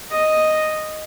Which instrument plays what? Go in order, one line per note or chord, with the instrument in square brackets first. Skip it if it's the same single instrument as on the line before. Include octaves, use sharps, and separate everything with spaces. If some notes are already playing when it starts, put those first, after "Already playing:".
[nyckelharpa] D#5